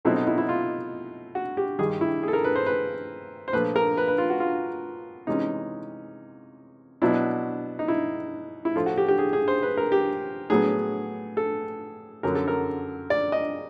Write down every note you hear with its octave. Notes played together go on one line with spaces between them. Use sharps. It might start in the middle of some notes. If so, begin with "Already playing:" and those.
B2 F#3 A3 C4 D#4 E4
D#4
E4
E4
F4
F#4
G4
G2 D#3 G3 G#4
E4
G#4
A4
A#4
B4
C5
B4
C5
A#2 F3 A3 B4
A#4
B4
B4
F4
F#4
F4
C3 E3 G#3 C#4 D#4
B2 F#3 B3 D4 E4
D#4
E4
E4
A2 F3 A3 F4
F#4
G4
G4
G#4
G#4
C5
B4
A#4
G4
A2 F#3 B3 G#4
A4
F#2 D3 F#3 A#4
A4
A#4
D5
D#5